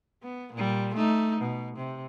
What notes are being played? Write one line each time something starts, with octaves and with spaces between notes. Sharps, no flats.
B3
A#2 G3
A3 D#4
B2
C3